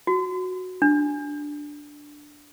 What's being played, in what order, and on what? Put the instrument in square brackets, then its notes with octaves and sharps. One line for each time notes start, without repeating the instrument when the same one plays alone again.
[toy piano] F#4
D4